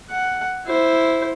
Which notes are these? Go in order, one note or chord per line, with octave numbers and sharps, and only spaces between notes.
F#5
E4 C5